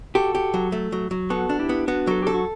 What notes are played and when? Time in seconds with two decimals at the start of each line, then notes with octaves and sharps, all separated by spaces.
0.15 F#4 G4 A4
0.35 G4
0.54 F#3
0.72 A3
0.92 F#3
1.11 F#3
1.30 B3 F#4 A4
1.49 D4
1.59 E4 G4
1.69 B3
1.88 B3 D4 F#4
2.07 F#3 A4
2.23 G4 A4
2.34 F#4